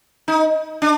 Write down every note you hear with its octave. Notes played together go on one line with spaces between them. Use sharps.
D#4
D4